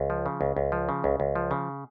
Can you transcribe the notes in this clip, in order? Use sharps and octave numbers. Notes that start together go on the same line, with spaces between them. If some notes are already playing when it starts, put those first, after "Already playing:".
Already playing: C#2
F3
C#3
C#2
C#2
F3
C#3
C#2
C#2
F3
C#3